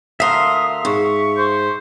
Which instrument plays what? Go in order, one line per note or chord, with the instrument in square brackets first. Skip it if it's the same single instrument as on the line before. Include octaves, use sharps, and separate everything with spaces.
[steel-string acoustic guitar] D2 A#4 [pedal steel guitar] E5 F5 C6 [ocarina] D#6
[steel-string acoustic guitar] G#2 [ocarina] C#6
[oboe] C5